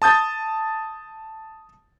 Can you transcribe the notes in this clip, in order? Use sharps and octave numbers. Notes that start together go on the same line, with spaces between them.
A5 D#6 G6 A6